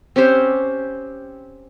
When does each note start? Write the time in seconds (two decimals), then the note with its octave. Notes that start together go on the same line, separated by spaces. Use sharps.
0.16 C4 C#4 G4 C5